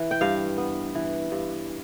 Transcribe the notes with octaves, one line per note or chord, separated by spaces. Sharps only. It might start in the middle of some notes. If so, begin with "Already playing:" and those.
Already playing: E3
G5
G2 F5
B3
E3
G2